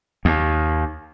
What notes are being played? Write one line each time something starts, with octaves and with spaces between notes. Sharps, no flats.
D#2